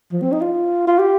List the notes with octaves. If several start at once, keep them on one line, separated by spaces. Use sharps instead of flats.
F3
C4
D#4
F4
F4
G4